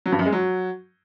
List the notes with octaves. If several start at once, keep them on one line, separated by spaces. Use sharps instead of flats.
F#3
G2
F#2
G#3
F#3